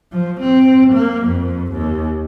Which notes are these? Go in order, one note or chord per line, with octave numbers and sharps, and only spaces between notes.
F3
C4
A#3
F2
D#2